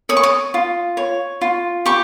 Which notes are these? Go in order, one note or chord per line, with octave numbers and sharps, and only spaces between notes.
C#5 D#6
C#6
D#6
F4
C#5
F4
G4 C#6